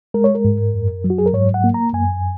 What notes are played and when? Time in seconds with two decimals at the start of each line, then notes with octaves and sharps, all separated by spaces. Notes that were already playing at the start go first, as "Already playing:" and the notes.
0.14 G#3 A#4
0.24 C#5
0.35 A#4
0.45 G#2
0.74 F#2
1.04 F#3
1.10 F#4
1.18 G#4
1.26 A#4
1.34 G#2 C#5
1.54 F#5
1.64 A#3
1.74 A#5
1.94 F#2 G#5